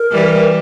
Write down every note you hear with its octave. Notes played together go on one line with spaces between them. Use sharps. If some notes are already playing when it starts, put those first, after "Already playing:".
Already playing: A#4
E3 G3